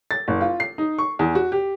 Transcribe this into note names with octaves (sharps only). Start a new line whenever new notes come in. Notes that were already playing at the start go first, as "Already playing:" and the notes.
A6
F#1
F4
C7
D#4
C#6
E2
F#4
G4